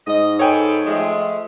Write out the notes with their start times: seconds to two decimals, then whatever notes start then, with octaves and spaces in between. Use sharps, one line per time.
0.07 G#2 D#5
0.39 G#3 A4 B4 C#5 G5 G#5
0.86 F3 G#3 A3